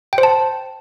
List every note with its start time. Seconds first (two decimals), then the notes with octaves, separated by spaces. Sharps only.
0.13 G5
0.18 C5
0.23 A5